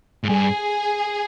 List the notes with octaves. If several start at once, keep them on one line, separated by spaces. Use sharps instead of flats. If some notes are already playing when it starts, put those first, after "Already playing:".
G#2
G2 G#4